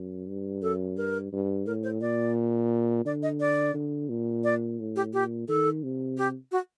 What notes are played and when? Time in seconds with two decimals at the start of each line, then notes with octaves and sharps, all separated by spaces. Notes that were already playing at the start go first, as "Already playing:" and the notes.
Already playing: F#2
0.28 G2
0.62 F#2 A4
0.97 G2 A#4
1.33 G2
1.66 A2 A#4
1.83 C5
2.01 A#2 D5
3.05 D3 D5
3.23 D#5
3.40 D5
3.74 D3
4.10 A#2
4.44 D5
4.79 A2
4.96 G4
5.13 A#2 G4
5.48 D#3 A4
5.83 C3
6.18 G4
6.52 F#4